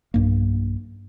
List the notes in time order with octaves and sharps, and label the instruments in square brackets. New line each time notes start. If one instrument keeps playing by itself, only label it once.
[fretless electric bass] B1 G2 A#3